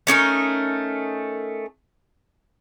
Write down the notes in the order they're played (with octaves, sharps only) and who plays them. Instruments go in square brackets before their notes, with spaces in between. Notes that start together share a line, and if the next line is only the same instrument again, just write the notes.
[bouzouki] A3 C#4 D#4 A#4